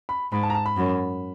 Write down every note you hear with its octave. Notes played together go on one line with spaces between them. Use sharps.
B5
G#2 B5
A5
A#5
A5
B5
F#2